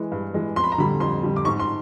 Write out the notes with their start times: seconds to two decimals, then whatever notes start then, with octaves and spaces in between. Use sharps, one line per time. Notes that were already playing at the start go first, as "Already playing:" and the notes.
Already playing: E3 G#3
0.12 G2
0.34 E3 G#3
0.56 F2 C6
0.64 B5
0.72 A#5
0.78 D3 G3 B5
1.00 F2 C6
1.23 D3 G3
1.36 D6
1.45 G#2 C#6
1.60 C6